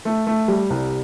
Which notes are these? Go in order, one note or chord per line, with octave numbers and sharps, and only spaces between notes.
A3
A3
G3
C2